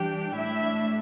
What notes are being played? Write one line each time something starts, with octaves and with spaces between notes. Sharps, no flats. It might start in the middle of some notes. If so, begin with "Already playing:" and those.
Already playing: E3 G3 D4 G4 G5
A2 A3 D4 E4 E5